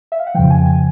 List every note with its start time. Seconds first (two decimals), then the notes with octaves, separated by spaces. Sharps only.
0.12 E5
0.19 F5
0.27 F#5
0.35 F2 C#3 F3 G5
0.50 G#5
0.66 G#5